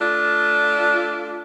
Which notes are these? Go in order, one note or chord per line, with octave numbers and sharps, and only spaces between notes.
A3 D4 F4